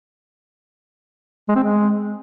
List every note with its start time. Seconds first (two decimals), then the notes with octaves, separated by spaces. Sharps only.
1.48 G#3
1.56 C4
1.63 G#3